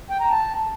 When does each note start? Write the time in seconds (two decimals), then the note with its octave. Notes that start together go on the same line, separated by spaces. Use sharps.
0.10 G5
0.20 A#5
0.30 A5